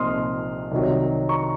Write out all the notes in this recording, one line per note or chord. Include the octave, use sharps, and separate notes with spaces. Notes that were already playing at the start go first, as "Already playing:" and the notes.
Already playing: C2 A#2 F3 C4 D#4 C6 D#6 F6
C2 C3 D#3 F#3
A#5 C#6